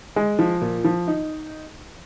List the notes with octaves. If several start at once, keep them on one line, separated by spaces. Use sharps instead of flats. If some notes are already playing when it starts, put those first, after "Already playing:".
G#3
F3
A#2
F3
D#4